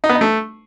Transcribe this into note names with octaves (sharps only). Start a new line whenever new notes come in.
D#4
B3
D#4
A3